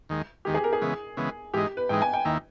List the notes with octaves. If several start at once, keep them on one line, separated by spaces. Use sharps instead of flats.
D#2 D#3 G#3
D#2 D#3 G#3 G4
G#4
A#4
G#4
C#3 E3 G#3 B3
C#3 E3 G#3 B3
G#2 E3 G#3 D#4 G4
B4
G#2 E3 G#3 D#4 G5
G#5
G5
D#2 D#3 A#3 E4